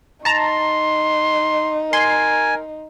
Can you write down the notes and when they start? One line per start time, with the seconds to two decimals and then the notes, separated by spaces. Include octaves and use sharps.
0.25 D#4 A5 A#5 C6
1.93 A#4 G#5 C6